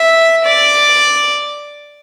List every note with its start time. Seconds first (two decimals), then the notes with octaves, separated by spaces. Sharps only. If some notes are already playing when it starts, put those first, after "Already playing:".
Already playing: E5
0.44 D5